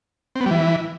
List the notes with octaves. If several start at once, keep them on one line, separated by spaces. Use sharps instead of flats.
C4
B3
G3
E3